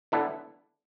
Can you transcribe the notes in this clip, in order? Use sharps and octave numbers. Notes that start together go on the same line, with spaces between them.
D3 B3 D4 E4 A4